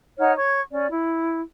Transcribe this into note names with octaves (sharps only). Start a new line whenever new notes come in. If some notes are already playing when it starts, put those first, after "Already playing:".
D#4 C#5 F#5 F6
C#5 C#6 G#6
C#4 D5
E4